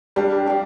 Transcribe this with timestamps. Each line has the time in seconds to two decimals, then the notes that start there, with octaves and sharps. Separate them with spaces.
0.16 G3 D4 G4 F5
0.46 D4 G4 F5